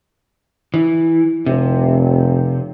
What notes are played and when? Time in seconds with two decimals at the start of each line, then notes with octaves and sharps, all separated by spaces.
0.74 E3
1.46 F1 C3